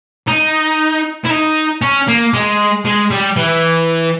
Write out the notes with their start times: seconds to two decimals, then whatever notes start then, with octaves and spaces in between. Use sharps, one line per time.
0.28 D#4
1.26 E4
1.30 D#4
1.82 C#4
2.08 A#3
2.33 G#3
2.85 G#3
3.11 G3
3.36 E3